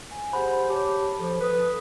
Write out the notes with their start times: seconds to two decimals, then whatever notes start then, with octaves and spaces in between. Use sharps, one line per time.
0.11 G#5
0.33 G4 G#4 C5 F#5 B5
0.69 G4 C#5 A5
1.19 F3 A4
1.41 A4 B4 D#6